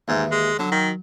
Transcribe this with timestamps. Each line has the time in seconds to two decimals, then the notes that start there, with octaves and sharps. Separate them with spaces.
0.08 D#2 G#2 E3
0.31 G#3
0.59 D3 F#3
0.71 D#3